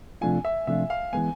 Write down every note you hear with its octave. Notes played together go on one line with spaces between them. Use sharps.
C3 F3 A3 D4 F4 G#5
E5
C3 F3 A3 D4 F4 E5
F5
E3 G#3 B3 G#5